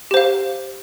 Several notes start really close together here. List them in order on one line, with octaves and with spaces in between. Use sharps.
G4 C5 F5